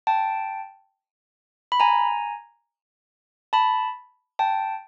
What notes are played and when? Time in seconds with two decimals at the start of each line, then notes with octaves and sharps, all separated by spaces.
0.07 G5 A5
1.72 B5
1.80 G#5 A#5
3.53 A5 B5
4.39 G5 A5